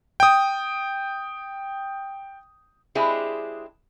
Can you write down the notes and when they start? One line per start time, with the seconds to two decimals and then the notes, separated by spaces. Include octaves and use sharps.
0.20 G5 D#6
2.95 G#3 C4 D4 E4 G4 G#4